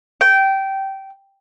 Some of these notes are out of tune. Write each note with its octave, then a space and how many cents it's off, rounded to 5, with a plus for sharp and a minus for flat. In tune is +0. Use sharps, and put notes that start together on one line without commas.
G5 -15